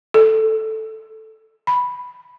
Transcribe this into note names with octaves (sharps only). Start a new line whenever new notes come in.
A4
B5